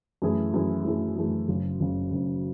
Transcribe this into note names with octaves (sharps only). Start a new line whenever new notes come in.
F#2 E3 A3 E4 G#4
F#2 E3 A3 E4 G#4
F#2 E3 A3 E4 G#4
F#2 E3 A3 E4 G#4
F#1 F#2 C#3
F#1 F#2 C#3
F#1 F#2 C#3